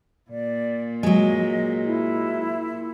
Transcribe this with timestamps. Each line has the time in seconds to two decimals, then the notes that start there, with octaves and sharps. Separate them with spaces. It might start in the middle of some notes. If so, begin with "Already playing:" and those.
0.31 A#2 D5
1.03 F#3 G#3 D#5
1.85 E4